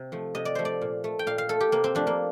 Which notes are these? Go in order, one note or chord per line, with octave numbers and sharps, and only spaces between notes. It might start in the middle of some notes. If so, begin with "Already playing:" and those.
Already playing: C3
F3 A3
C3 D#5
D5
F3 A3 C5
D5
A#2
A3
G5
A#2 F5
F5
A3 A4
G4
C3 A#3
C4
F3 A3 D4
A#3